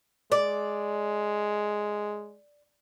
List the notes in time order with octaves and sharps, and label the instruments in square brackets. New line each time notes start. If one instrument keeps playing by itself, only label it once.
[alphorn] G#3 [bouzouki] D5